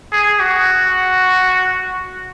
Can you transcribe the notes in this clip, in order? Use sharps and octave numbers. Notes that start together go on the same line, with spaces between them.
G#4
F#4